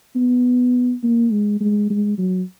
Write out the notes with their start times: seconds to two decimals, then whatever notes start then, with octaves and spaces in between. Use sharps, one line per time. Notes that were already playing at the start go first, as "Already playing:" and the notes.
0.16 B3
1.03 A#3
1.31 G#3
1.61 G#3
1.90 G#3
2.18 F#3